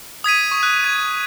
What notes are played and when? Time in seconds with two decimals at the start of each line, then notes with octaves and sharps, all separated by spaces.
0.24 D#6 G#6 B6 D#7
0.51 C#6
0.63 F#6
0.84 G#6